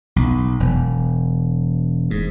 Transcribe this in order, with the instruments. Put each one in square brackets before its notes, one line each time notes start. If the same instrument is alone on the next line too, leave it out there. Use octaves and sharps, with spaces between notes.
[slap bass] B1
E1
G#2